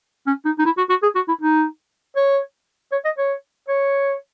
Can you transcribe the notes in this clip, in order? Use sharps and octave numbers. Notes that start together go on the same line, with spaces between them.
C#4
D#4
D#4
E4
F#4
F#4
G#4
F#4
E4
D#4
C#5
C#5
D#5
C#5
C#5